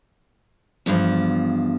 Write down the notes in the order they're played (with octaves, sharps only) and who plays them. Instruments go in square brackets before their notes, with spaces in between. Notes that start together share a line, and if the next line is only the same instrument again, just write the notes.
[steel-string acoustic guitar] E2 G2 F3